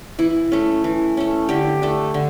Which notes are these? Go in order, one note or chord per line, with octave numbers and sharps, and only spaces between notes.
E3 E4
A3 C#4
E3
A3 C#4
D3 G4
A3 D4
D3